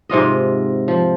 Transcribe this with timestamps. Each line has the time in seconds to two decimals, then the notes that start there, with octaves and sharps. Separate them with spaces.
0.09 G#2 C3 F4 D#5
0.88 F3